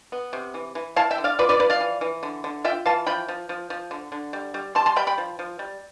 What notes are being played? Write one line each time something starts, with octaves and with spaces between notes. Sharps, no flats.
B3
C3
E3
E3
E4 F5 A5
E5 G5
D3
D5 F5
F4 B4 D5
B4 D5
F3 B4 D5
D5 F5
E3
E3
D3
D3
F4 E5 G5
E3 F5 A5
F3 G5 B5
F3
F3
F3
D3
D3
G3
G3
G3 A5 C6
A5 C6
G3 G5 B5
G5 B5
F3
F3
G3